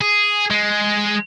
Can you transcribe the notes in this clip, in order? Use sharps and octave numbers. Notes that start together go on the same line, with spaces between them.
G#4
G#3